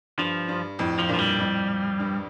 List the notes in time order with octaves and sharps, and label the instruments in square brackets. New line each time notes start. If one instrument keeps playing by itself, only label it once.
[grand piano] G2 [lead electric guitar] F3
[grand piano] G2
F2 A2
[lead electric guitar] F3
[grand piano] G2 A#2 [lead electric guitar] F3
[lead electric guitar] G3
[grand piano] F2 A2
G2